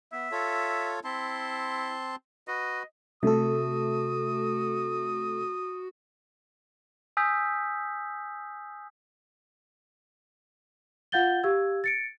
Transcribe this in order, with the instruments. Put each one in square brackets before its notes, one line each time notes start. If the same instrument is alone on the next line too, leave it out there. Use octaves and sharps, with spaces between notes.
[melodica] B3 [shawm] E5
[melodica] F4 A4 C#5
[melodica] C4 A5 C6 [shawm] E4
[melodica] F#4 B4 [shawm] D#5
[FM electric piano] C3 A4 [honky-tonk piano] A3 [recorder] F#4 [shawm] D#6
[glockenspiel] G#5 D#6 E6 G6 B6
[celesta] F4 F5 F#5 G6 A6 G7
G4 F5 E6 G#6
A6 C#7 D7